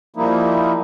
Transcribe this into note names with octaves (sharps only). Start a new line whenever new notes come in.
F3 G3 A#3 D#4 E4